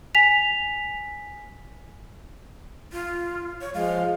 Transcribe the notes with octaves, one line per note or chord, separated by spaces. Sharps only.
G#5 B6 F7
F4
C#5
F3 G#3 F5